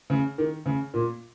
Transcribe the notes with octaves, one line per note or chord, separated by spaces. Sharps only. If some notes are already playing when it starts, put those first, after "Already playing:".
C#3
D#3
C#3
A#2